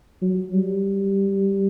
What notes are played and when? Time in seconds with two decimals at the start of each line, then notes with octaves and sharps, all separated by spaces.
0.22 F#3
0.54 G3